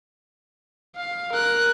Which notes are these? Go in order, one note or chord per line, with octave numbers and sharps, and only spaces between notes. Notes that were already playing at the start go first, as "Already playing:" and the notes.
F5
A#4 F#6